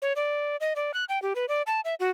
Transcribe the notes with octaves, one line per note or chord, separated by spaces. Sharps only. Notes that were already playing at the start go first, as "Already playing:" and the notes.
C#5
D5
D#5
D5
F#6
G5
G4
B4
D5
A5
E5
F#4